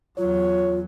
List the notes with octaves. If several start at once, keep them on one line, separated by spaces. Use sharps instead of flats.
E2 F#3 F4 C#5